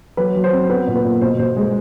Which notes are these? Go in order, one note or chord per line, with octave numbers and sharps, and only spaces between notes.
F#3 B4
F#3
C5
C4
B3 B4
A#2
B4
A#2
B2 C5
B2 C5
G#3